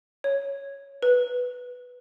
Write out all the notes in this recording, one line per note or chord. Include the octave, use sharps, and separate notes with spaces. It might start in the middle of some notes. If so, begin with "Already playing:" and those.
C#5
B4